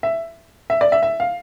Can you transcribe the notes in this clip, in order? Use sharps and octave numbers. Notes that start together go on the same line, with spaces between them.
E5
E5
D5
E5
E5
F5